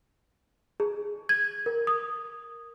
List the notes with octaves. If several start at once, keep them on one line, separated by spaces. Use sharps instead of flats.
G#4
G#6
A#4
D#6